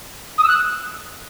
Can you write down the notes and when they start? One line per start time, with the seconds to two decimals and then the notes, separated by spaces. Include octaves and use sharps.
0.38 D#6
0.43 E6
0.48 F#6